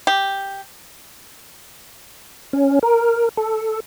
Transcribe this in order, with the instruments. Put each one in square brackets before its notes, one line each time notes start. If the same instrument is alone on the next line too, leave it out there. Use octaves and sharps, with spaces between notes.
[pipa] G4
[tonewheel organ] C#4
A#4
A4